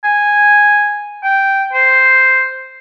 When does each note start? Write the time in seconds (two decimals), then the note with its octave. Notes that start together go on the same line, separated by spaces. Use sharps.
0.04 G#5
1.24 G5
1.73 C5